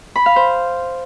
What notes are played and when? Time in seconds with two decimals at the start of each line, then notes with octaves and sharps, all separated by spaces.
0.16 B5
0.26 F5
0.36 C5